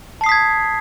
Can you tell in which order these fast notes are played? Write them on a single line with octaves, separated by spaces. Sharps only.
A5 C7 D#6 B6 G#6